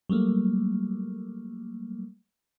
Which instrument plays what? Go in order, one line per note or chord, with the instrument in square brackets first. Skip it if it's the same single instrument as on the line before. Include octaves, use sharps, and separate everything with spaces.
[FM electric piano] F#3 G3 A3 A#3